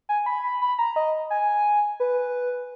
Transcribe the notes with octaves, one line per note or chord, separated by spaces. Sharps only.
G#5
B5
B5
B5
A#5
D#5
G#5
B4